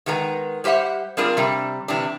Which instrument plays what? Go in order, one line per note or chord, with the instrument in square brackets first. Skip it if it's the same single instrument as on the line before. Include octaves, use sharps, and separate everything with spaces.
[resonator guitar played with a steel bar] D#3 G#3 B3 G4 A#5
G3 G4 C5 E5 F#5
G3 C4 D4 F4 G#4 A#4
C3 G3 D4
C3 E3 G3 D4